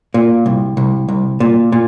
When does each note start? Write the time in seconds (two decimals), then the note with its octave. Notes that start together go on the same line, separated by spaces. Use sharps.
0.14 A#2
0.46 C2
0.77 C2
1.09 C2
1.40 A#2
1.72 A#2